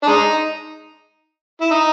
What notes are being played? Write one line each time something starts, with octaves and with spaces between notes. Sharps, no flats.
D4
G#3 D#4
E4
D#4